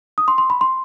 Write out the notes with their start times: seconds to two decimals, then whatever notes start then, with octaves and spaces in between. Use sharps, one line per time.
0.18 D#6
0.28 C6
0.38 C6
0.50 B5
0.61 C6